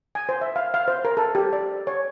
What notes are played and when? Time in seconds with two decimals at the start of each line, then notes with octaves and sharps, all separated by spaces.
0.15 G#5
0.29 C5
0.41 E5
0.56 F5
0.74 F5
0.88 C5
1.05 A#4
1.17 A4
1.35 G4
1.53 D5
1.87 C#5